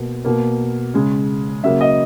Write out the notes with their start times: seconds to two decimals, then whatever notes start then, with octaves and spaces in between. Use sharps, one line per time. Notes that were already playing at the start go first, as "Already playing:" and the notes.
Already playing: B2 A#3
0.25 B2 A#3
0.94 C#3 G#3
1.63 C#3 F#3 A#3 E5
1.81 D#5